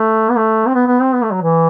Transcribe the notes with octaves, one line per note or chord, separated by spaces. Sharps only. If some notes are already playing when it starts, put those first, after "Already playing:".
Already playing: A3
B3
A3
C4
B3
B3
C4
B3
A3
F#3
E3